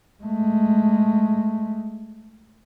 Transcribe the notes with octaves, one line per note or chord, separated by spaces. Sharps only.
G#3 A3